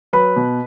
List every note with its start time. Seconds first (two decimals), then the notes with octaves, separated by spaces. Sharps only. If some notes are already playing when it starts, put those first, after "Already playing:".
0.13 F#3 B4 B5
0.36 B2